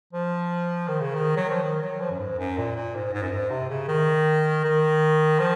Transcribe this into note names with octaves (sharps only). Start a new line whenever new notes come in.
F3
D#3
C#3
D#3
F#3
F3
D#3
F#3
F3
F#2
G#2
F#2
A#2
A#2
G#2
G#2
F#2
G#2
C3
C#3
D#3
D#3
F3